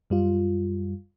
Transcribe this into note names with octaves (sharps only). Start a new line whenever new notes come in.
F#2 G3 F4